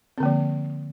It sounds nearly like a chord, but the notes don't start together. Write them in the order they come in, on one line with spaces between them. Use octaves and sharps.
C4 D3 A#3 F3